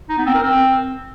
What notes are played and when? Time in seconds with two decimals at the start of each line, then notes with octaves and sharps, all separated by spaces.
0.09 D#4
0.18 B3
0.26 C4
0.34 A#4
0.43 C4